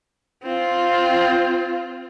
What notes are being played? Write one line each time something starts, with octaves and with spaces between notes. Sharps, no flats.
C4 F4